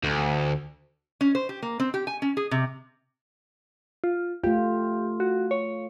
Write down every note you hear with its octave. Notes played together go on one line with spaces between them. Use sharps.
D2
C#4
C5
G4
A#3
C4
G4
G#5
C#4
G#4
C3
F4
A3 F4 G4
F#4
C#5